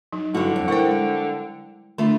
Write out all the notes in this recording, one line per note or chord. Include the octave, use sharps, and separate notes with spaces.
F#3 D#4
G2 D3 G3 E4 F#4
F2
E4 A#4 C5 F#5 G5
G#3
D3 A3 D4 F4